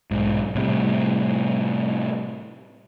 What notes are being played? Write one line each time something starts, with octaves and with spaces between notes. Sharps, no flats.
B1 G#2
A2 C3 G3